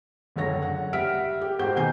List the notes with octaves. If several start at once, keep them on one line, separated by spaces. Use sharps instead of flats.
C#2 F#2 D3 C#5 A#6
F#5
G3 E5 F#5 F6 B6 D7
G4
G#2 F#4 G4 C5 G6
B2 D#3 G#5 G6 C7